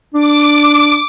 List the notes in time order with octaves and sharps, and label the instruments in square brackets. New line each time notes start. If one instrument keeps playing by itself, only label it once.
[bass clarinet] D4 [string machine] D6